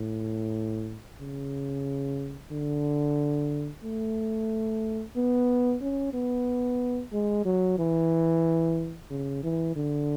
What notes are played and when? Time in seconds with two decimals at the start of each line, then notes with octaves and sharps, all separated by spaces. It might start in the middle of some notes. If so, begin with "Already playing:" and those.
Already playing: A2
1.21 C#3
2.52 D3
3.84 A3
5.16 B3
5.81 C#4
6.14 B3
7.13 G#3
7.45 F#3
7.79 E3
9.10 C#3
9.43 E3
9.76 D3